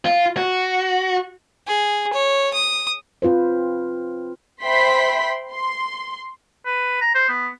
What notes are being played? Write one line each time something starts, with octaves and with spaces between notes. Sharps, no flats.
F4
F#4
G#4
C#5
D#6
C4 F4 B4 C5
C5 E5 G5 B5 C6 B6
C6
B4
A#5
C5
B3